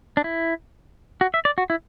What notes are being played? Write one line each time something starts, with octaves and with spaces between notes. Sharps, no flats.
D4
E4
F#4
E5
D5
F#4
E4